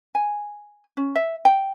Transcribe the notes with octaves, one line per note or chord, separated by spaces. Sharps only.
G#5
C#4
E5
G5